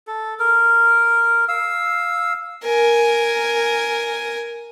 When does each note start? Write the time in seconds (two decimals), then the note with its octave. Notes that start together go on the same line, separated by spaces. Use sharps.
0.07 A4
0.39 A#4
1.48 F5 E6
2.64 A#4 G#5